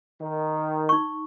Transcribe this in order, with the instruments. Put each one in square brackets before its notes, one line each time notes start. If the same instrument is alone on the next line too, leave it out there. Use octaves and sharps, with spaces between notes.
[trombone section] D#3
[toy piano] D#4 C#6